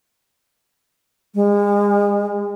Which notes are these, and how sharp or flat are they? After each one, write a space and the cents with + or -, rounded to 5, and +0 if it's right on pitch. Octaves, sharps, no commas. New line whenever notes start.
G#3 -35